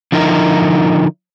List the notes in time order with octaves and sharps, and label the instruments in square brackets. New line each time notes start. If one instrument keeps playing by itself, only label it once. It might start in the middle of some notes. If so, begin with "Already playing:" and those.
[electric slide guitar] D3 F3 D#4 E4 A#4